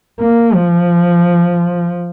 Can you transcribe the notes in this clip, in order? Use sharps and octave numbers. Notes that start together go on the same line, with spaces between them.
A#3
F3